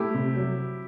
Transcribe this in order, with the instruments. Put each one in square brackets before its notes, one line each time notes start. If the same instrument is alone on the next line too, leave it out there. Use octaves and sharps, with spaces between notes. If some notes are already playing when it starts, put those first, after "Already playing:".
Already playing: [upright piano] A3 [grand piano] E4 G4
[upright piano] C3
F#3